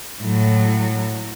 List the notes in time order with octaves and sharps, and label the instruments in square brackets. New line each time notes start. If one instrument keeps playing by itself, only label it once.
[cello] A2 F#3